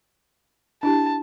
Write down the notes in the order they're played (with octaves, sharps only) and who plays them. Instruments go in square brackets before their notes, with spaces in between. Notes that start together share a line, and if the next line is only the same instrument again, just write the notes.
[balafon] D4 E4 G4 [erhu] A5